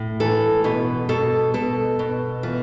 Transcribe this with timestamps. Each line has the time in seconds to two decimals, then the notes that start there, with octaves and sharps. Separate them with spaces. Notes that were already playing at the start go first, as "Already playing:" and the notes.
Already playing: A2
0.20 E3 A4
0.64 B2 B4
1.09 B2 A4
1.54 B2 A4
1.99 B2
2.43 E3 F4